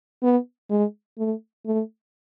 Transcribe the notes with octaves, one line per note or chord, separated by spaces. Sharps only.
B3
G#3
A3
A3